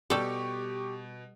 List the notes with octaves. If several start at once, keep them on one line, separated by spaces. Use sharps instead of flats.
B2 G3 G4 A4 C#6